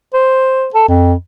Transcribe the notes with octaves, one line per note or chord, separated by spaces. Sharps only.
C5
A4
F2